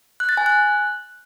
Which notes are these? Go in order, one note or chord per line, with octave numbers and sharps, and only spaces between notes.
F#6
A6
G#5
F#6